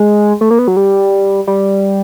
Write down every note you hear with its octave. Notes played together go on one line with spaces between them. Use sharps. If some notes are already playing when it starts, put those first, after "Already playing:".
Already playing: G#3
A3
A#3
B3
F#3
G3
G3